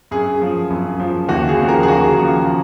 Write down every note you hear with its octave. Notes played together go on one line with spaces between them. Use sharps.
F#2 G#4
F3
F#2
F3
D#2 F#4
G#4
C#3 F3
A#4
G#4
D#2 F#4
C#3 F3